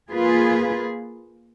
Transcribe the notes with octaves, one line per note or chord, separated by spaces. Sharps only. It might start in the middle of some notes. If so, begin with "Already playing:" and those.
A#3 F4 G#4 B4